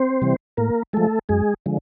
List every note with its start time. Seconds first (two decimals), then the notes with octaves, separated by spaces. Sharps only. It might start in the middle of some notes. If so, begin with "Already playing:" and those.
Already playing: C4 C5
0.22 C3 E3 G3
0.57 A2 A#3 A#4
0.93 F3 G#3 A3 A4
1.29 F#2 G#3 G#4
1.66 D3 F3 G#3